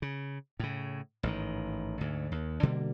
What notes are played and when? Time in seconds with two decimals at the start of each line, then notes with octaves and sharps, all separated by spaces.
0.02 C#3
0.60 A2 C#3
1.23 A1 G#2 D3 D#3
2.01 D2 G#2
2.32 D#2
2.63 B2 D3 G3 A#3